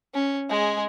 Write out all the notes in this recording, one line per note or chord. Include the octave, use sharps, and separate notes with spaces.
C#4
G#3 G#4